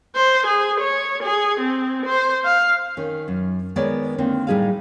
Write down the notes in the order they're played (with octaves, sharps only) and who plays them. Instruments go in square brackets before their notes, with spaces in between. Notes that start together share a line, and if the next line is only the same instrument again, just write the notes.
[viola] C5
G#4
C#5
G#4
C4
C5
F5
[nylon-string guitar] D#3 C#4
F#2
D#3 G#3 B3 C#5 D5
D3 D#3 A#3 C4
A2 G3 D#4 G#4 A4 F5